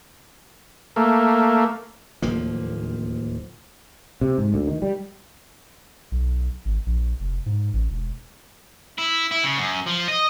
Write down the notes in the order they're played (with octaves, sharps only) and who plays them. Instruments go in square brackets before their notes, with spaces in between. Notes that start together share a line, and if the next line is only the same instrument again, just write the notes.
[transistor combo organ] A3 A#3
[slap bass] D1 D#2 F3 A#3
[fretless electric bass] C3
G#2
D2
D#3
G3
[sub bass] B1
G#1
A#1
F1
G#2
A1
E1
[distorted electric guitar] E4
E4
C#3
F#2
F3
D#5